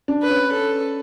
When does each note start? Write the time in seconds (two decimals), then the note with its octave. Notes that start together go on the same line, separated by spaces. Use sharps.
0.08 D4
0.23 B4
0.30 C#4
0.52 A4